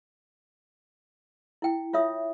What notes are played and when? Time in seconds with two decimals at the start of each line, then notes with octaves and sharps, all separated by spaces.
1.62 E4 G5
1.93 F4 C#5 E5 D#6